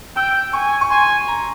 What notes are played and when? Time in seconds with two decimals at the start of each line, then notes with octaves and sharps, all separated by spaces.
0.16 G5 E6
0.53 G#5 C#6
0.81 C#6
0.90 G#5 C6
1.28 A#5